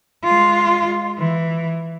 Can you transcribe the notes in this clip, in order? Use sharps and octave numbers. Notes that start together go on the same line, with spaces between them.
G#3 F4
E3